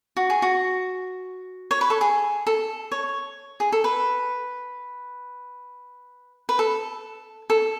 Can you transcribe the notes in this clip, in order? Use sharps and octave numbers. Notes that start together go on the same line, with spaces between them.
F#4
G#4
F#4
C#5
B4
A4
G#4
A4
C#5
G#4
A4
B4
B4
A4
A4